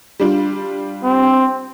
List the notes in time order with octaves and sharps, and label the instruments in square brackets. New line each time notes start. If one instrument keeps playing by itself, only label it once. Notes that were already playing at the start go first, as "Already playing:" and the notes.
[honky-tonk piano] G3 D4 F4
[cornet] C4